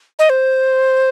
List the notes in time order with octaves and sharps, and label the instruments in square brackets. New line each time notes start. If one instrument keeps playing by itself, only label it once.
[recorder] D#5
C5